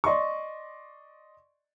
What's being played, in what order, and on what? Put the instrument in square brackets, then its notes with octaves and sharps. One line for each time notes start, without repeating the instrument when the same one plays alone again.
[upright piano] D5 D#5 C6 C#6